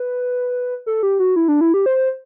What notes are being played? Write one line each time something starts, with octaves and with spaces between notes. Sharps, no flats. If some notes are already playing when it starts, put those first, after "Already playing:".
Already playing: B4
A4
G4
F#4
E4
D4
E4
G4
C5